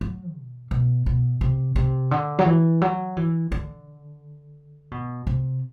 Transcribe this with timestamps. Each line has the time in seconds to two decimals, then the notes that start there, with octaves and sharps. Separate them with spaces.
0.01 F#3
0.35 B2
0.71 B2
1.06 B2
1.41 C3
1.76 C3
2.11 D3
2.39 F#3
2.46 E3
2.82 F#3
3.17 E3
3.52 D3
4.91 B2
5.27 C3